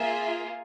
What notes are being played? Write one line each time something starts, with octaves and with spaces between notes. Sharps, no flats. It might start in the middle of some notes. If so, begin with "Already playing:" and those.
Already playing: A#3 F4 G#4 E5